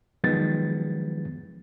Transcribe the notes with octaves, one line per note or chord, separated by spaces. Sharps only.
D#3 F3 F#3 G#3 B3 A6